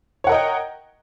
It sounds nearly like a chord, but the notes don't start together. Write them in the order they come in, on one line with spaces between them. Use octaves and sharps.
C#5 F#5 A#4 D#5 G5